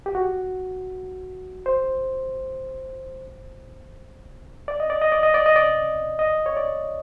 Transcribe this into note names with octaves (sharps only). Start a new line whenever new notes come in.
G4
F#4
C5
D5
D#5
D5
D#5
D5
D#5
D5
D#5
D5
D#5
C#5
D5